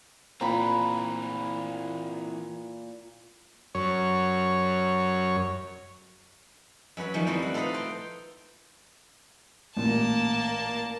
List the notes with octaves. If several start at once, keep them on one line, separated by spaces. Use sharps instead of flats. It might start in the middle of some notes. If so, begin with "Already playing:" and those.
A#2 E3 C4 A#5 B5
F#2 C#5
F#2 C#4 B4 F#5
D#3 F3 G3 A3 C#4
G3 C4 D#4 E4
F#5
F4 A4 B4 D#5 F5 F#5
C5 G5
A1 A#2 A#3 A5